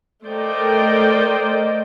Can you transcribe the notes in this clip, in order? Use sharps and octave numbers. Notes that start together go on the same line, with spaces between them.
A3 A#4 C5 D5 D#5 G5